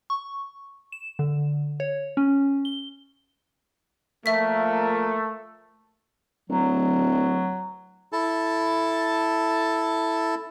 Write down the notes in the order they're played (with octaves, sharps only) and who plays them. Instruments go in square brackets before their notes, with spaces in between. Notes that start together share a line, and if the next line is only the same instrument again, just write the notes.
[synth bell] C#6
E7
D3
C#5
C#4
G7
[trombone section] A#2 F3 A#3 [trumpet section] A3 [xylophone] E5 B6
[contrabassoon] D1 [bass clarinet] F#3
[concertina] E4 A4 A5